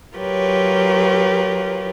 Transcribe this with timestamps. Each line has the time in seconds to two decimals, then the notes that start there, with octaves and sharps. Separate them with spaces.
0.16 F#3 F4 G4 A#4 B4 C#5